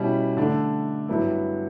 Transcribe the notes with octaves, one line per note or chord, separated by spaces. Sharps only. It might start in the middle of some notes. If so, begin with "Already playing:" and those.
Already playing: B2 G3 C#4 E4
D3 A3 D4
G2 F#3 B3 E4